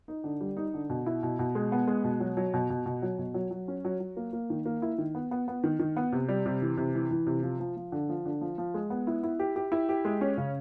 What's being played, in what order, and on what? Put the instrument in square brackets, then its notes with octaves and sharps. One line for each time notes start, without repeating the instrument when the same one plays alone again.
[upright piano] D#4
D3
G3
D#4
D3
B2
E4
B2
B2
G#3
B3
G#3
B2
F#3
F#3
B2
B2
B2
F#3
B2
F#3
F#3
C#4
F#3
F#3
A#3
A#3
D#3
A#3
E4
D#3
B3
B3
B3
D#3
D#3
B3
C3
G3
C3
E3
C3
E3
E3
C3
F3
F3
F3
D3
F3
D3
F3
F3
G#3
B3
E4
E4
G4
G4
E4
G4
G#3
C#4
C#3